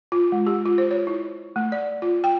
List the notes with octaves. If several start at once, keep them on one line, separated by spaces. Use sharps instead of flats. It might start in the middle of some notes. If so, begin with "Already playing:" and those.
F4
G#3
G4
F4
C5
C#5
E4
A3
D5
F4
G5